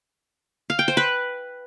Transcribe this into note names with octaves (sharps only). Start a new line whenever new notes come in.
F5
G5
C5
B4